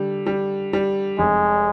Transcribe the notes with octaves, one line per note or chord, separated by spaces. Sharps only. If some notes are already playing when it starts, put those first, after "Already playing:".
Already playing: D3 G3
G3
G3
F1 G#3